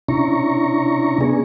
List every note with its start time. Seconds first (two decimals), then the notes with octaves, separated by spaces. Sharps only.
0.09 C3 C#4 D4 E4 A#5 C#6
1.21 B3 D4 G#4